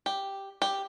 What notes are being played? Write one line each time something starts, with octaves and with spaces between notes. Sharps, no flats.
G4
G4